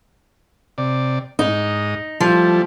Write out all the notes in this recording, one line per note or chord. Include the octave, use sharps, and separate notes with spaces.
C3 D5
G#2 D#4 D#6
F3 G3 A3